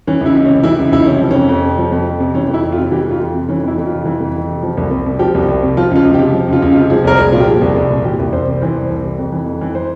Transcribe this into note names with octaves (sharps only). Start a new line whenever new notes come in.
E3 C#4
C#2
E4
C#2
C#4
C3
E3 E4
C#2
C#2 E4
C3 C#4
F3
F2 C#4
F2
C3
F3
F2
F2
C3
E3 C#4
F2
E4
F2
F4
C3
E3 G4
F2 F4
F2
C3
E3 C#4
F2 E4
F2
C3 F4
E3
F2
F2
C3
F3
C2
C2
C3
F3 G4
C2
C2
C3
F3 F4
C#2 F4
C#2
G4
C3
F3
C#2 F4
C#2
F4
C3
F3 G#4
C2 A#4
C2 G#4
A#2 F4
G4
F3 G#4
C2
C2
A#2
E3 G4
C2
C2 C5
C3
E3 C5
C2
C2
C3
F2
E3
F2
E3
C5